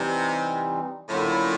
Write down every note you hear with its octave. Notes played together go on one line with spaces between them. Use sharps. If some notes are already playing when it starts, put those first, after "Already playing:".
Already playing: C3 E3 G3 C4 D#4
A2 D3 F#3 A#3 C#4 F4